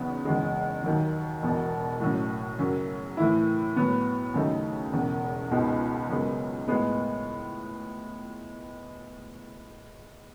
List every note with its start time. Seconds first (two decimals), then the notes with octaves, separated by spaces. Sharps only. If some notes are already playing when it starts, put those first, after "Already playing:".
Already playing: E2 C#3 F#3 B3 D#4
0.25 F#1 E2 C#3 G#3
0.84 D#2 D#3 F#3
1.42 E1 E2 B2
2.00 A2 F#3 C#4
2.59 F#2 C#3 F#3 C#4
3.17 A2 E3 A3 E4
3.76 A2 F#3 B3
4.34 D#2 C#3 F#3 A3 D#4
4.92 E1 E2 C#3
5.51 C#2 B2 G#3 B3 D#4
6.09 F#2 C#3 G#3 B3
6.68 A2 G#3 B3